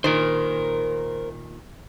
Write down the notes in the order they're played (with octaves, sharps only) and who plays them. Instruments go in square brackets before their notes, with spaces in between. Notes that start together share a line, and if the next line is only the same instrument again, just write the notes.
[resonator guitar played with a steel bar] A#2 D#3 [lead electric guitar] A#4 C5